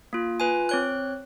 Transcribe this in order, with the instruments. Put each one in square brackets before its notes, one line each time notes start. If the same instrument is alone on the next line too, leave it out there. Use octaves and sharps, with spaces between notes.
[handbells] A#3 F4
F4 B4 G#5
C4 C#5 F#6